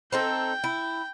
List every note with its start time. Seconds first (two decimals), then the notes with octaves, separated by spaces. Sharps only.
0.12 C4 D#4 A4 G5
0.64 E4